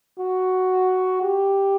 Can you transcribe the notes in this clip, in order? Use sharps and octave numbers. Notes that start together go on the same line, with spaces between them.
F#4
G4